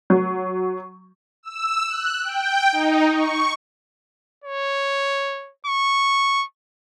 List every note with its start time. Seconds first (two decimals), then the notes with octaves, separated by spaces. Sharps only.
0.10 F#3
1.43 E6
1.87 F#6
2.24 G5
2.72 D#4
3.12 C#6
4.44 C#5
5.67 C#6